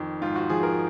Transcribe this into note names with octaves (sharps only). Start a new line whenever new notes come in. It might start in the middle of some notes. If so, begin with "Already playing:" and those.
Already playing: F2 D#3
G#2 F4
F#4
F3 G#4
A#4